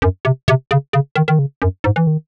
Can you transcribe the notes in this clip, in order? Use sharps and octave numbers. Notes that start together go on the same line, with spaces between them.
F#2
C3
C3
C#3
C#3
D#3
D#3
C#3
F#2
G#2
E3
D#3